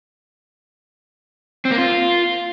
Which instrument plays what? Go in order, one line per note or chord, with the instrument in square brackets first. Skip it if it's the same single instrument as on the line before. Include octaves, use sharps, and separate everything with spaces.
[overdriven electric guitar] C4
A#3
F4